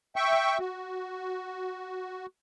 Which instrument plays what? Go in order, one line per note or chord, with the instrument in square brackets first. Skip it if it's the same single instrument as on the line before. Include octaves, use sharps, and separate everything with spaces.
[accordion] E5 G5 C#6
F#4